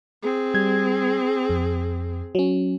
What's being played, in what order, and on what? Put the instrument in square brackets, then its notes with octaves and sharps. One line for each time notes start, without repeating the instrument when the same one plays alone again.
[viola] C4 G#4
[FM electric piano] G3 G#6
F2
F#3 C#4